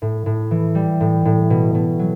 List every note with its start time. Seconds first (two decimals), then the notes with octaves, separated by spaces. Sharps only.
0.02 A2
0.26 A2
0.51 E3
0.75 G3
1.01 A2
1.25 A2
1.50 B2
1.75 B2
1.99 F#3